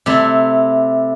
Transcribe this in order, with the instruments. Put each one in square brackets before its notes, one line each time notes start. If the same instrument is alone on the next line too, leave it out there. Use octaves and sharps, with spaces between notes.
[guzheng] C3 A3 E4